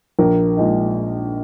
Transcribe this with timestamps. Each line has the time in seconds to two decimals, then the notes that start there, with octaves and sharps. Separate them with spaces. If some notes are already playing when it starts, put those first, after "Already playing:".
0.19 A#1 A#4
0.57 A#2 G#3 D#4